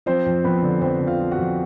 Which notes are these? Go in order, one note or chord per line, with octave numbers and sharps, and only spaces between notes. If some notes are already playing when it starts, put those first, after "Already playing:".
F3 C4 C5
F2
F2 B3 B4
D3
F2 C4 C5
D3
F4 F5
F3
F#4 F#5
F2